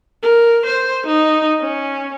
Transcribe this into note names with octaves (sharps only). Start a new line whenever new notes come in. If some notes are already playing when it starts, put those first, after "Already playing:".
A#4
C5
D#4
C#4